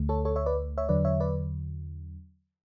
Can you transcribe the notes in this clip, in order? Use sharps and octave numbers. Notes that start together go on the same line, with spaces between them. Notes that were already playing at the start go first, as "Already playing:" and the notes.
Already playing: D2 D3 A3
A4 C#5
A4 C#5
C#5 E5
B4 D5
C#5 E5
E2 D3 F#3 B4 D5
C#5 E5
B4 D5